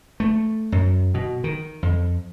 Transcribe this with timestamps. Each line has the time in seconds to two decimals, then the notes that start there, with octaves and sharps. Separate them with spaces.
0.20 A3
0.72 F#2
1.14 B2
1.44 D#3
1.83 F2